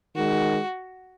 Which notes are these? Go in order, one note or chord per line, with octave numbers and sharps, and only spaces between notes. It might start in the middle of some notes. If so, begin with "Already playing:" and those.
D#3 G#3 F#4